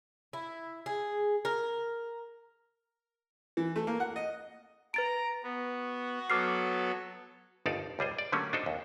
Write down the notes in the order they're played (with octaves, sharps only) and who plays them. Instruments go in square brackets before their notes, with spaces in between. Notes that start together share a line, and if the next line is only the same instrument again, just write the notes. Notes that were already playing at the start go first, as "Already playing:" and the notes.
[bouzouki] E4
G#4
A#4
[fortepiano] E3
A3
A#3
F#5
D#5
[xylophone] B4 A6 D7 [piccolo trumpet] A#5
[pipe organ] B3 [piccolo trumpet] F#4
[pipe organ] F#3 B3 A4 [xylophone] D6 F6 C7
[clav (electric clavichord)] G1 D#2 D#4 A4 D5 F5
C#2 G3 G#4 C5
D5
D3 F#3 G3 A3 A#3 C#4
D4 D#4 F#4 A4 C5
D#2